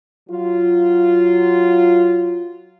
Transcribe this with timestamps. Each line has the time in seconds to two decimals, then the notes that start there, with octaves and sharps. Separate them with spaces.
0.30 F#3 F4